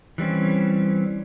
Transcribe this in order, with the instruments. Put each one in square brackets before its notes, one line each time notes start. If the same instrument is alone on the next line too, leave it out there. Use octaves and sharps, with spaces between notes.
[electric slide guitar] E3 G3 C4 C#4